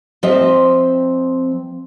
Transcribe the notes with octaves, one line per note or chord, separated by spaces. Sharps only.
F3 C4 D#5 E5